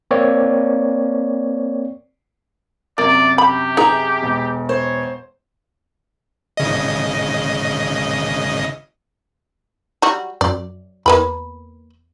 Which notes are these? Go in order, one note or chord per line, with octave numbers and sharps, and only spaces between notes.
A#3 C4 C#5 D5
F#2 C3 A#3 D5
G4 B5
D#4 G#4 A#5
E1
C5 C#5
G#1 C#3 D#5
F#3 G3 F#4
F#2 D5
E2 A#3 B4 B5